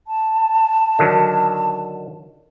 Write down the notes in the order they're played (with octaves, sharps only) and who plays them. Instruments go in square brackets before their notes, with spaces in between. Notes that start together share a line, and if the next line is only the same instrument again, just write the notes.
[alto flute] A5
[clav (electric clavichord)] D3 D#3 F#3